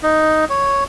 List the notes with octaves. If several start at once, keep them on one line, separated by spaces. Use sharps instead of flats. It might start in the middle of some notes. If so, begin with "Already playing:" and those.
D#4
C#5